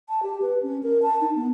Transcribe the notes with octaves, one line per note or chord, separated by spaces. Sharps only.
A5
G4
B4
C#4
A#4
A5
D#4
B3